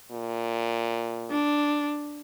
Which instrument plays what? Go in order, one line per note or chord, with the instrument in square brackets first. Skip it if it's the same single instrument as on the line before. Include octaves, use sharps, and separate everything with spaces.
[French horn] A#2
[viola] D4